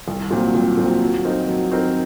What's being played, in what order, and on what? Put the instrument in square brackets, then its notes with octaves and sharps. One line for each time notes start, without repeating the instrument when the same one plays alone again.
[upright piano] C2
A#2 F#3 C4
C2
A#2 F#3 C4
F#3
C4 D#4 A#4
F#3
C4 D#4 A#4